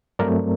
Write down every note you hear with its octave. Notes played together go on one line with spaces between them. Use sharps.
G2 F#3 A3 C4 A#4 D5